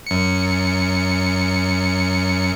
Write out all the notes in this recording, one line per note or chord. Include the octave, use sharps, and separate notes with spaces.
F#2 C#7